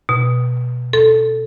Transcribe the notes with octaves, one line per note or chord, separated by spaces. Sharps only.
B2
A4